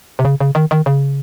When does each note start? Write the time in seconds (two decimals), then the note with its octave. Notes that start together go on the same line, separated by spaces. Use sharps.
0.19 C3
0.25 C#3
0.40 C#3
0.55 D#3
0.71 D#3
0.86 C#3